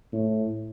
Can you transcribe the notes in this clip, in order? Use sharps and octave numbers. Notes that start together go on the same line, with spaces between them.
A2